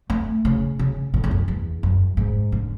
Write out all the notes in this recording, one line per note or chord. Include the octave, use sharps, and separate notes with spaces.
A3
C#3
C#3
A2
E2
F#2
E2
F#2
G#2
D3